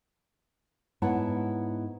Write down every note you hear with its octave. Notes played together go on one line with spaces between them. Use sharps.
G#2 B3 E4 C#5 F#5 A5